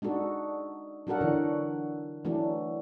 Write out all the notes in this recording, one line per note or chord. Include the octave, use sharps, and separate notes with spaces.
G#3 D4 D#4 F#4 A4
F#3 D4 F#4 A4 A#4 F#5
D3 E3
E3 F#3 A3 D4